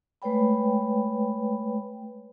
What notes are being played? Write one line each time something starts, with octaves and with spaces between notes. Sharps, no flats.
G#3 A3 B4 C#5 G5 B5